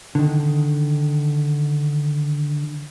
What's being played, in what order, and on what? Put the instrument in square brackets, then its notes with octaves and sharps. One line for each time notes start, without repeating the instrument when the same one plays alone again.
[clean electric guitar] D3 D#3